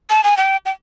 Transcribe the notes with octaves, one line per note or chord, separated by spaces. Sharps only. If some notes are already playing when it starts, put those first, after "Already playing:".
A5
G#5
G5
G5